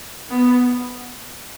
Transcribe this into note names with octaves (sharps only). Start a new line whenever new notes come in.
B3